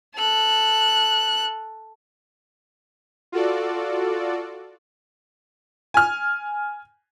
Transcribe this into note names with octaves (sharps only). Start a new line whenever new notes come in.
A4 F#6
F4 F#4 A4 D5
G#5 F6